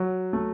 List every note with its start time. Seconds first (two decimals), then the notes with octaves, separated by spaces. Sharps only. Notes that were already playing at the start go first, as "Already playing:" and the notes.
Already playing: F#3
0.33 A3